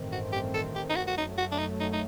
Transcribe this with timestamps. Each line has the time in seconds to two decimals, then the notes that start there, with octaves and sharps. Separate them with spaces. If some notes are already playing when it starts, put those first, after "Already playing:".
Already playing: A1 G2 D#3 A3 C4
0.12 F#4
0.32 G4
0.54 A4
0.75 G4
0.89 D#4
0.96 F#4
1.07 F#4
1.16 F#2 F#3 A3 D#4
1.38 F#4
1.52 D4
1.59 D#4
1.80 D#4
1.92 D#4